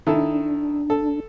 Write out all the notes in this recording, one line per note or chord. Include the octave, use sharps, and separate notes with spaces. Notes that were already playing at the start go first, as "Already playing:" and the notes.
D#3 D4 E4 A4
A4